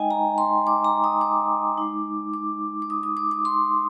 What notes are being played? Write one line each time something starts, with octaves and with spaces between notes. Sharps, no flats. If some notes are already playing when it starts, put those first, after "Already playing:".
Already playing: G#3 D#4 D#5 G5 G#5
A#5
C6
D6
A#5
D#6
D6
G#3 D#4
D6
D6
D#6
D#6
D6
D6
C6